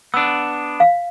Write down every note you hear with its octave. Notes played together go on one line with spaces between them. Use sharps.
B3 D4 E6
F5